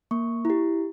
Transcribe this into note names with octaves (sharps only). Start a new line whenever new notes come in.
A#3 C#6
E4 G4